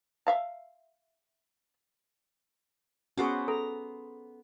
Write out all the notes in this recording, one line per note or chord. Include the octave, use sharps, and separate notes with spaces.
E5 F5 A5
B3 C#4 F#4 G#4 C5 D6
A4 A#5